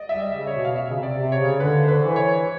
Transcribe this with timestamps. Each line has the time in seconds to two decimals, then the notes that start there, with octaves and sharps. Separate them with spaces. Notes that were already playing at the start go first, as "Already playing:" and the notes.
Already playing: D5 D#5
0.09 G3 E5
0.20 D#5
0.33 C#3
0.47 C#5
0.54 B2
0.65 F5
0.75 B2 E5
0.89 C#3
0.97 C3
1.03 D5
1.18 C3
1.32 C#5
1.39 C#3
1.60 D3 B4
1.83 C5
1.88 B4
2.03 E3
2.16 C#5